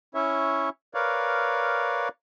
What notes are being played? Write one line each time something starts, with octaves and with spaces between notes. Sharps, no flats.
C#4 E4 C#5 E5
A#4 B4 C#5 D5 F5